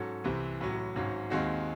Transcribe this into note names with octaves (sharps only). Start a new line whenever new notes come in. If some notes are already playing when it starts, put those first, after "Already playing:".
Already playing: G#2 F#3 C#4 F#4 A4
C2 C3 E3 C4
A1 A2 F#3
G#1 G#2 F#3 C#4
D#2 D#3 G#3 C4 F#4